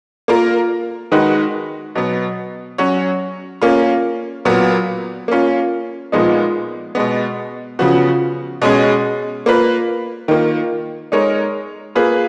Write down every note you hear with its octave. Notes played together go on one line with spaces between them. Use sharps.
A#3 F4 A#4
D#3 G#3 D#4 F#4 B4
B2 F#3 B3
F#3 C#4 F#4 C#5
A#3 C#4 F4
A#2 F#3 B3
A#3 C#4 F4
A#2 F3 G#3 B3 D#4
B2 G#3 B3
C#3 F3 B3 F#4
B2 G#3 C#4 G#4
A#3 F4 B4
D#3 A#3 F4
G#3 D#4 A#4 C#5
A#3 F4 G#4 B4